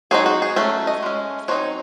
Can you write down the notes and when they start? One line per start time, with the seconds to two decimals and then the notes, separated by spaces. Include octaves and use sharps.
0.11 F#3 C4 D#4 G#4
0.26 F#4
0.42 G#4
0.56 F#3 A3 C#4
0.87 D#5
1.03 G#3 C#4
1.48 F#3 C4 D#4 C#5